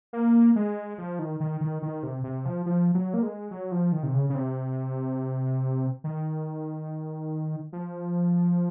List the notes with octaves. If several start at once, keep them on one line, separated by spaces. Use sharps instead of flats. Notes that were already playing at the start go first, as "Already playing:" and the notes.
A#3
G#3
F3
D#3
D#3
D#3
D#3
C3
C3
F3
F3
F#3
A#3
G#3
F#3
F3
D#3
C3
C#3
C#3
C3
D#3
F3